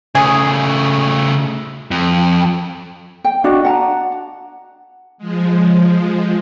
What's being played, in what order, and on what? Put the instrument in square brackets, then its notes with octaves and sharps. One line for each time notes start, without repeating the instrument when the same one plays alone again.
[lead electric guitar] C#3 A3 [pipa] G#4
[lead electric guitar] F2
[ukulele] G5
D4 F#4 D5 D#5
F#5 A5 A#5
[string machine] F3 G#3